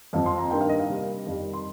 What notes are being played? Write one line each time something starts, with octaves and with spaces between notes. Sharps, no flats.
F2 F3 C4 F5
C6
A#5
G2 D#3 A#3 G5
F5
D#5
F5
C3 G3 A#3
F2 D#3 G3
C6